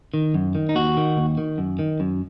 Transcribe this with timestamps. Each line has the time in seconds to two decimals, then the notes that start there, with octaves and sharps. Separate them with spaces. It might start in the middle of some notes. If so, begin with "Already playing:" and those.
0.14 D#3
0.34 F#2
0.55 D#3
0.69 D#4
0.75 D#2 F#4
0.97 D#3
1.17 D#2
1.38 D#3
1.58 F#2
1.79 D#3
2.00 F#2